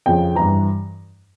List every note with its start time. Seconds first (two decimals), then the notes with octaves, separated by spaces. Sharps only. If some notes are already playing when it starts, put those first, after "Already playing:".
0.06 F2 C#3 F3 G5
0.35 G2 E3 A#5